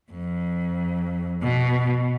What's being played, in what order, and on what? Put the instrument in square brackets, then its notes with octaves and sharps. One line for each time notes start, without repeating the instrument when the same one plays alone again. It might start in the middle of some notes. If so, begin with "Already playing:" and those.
[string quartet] F2
B2